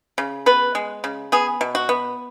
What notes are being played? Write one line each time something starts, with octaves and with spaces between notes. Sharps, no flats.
C#3
B3 B4
G#3
C#3
B3 G#4
B2
F#4
B3